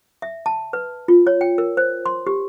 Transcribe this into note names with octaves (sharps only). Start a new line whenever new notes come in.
E5
A5
B4
F4
C#5
G5
A#4
C5
C6
G4